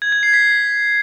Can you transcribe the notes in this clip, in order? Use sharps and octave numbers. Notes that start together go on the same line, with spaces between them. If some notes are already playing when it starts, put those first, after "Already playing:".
G#6
G#6
C7
B6